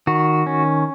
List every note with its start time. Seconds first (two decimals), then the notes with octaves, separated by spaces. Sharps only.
0.07 D#3 F#4
0.47 C#4